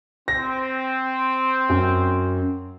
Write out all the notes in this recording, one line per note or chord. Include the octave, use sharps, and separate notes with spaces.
C4 A#6
F#2